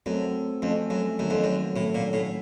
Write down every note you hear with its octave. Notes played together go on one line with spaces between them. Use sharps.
F#2 A3 C4 F#4 A4
F2 F3 A3 C#4 A4
F#2
F#2 D#3 F#3 A#3
F2
F#2
A2 F#3 A3 C#4 A4
A#2
A2